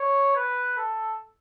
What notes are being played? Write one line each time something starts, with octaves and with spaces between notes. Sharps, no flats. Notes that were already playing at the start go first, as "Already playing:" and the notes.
Already playing: C#5
B4
A4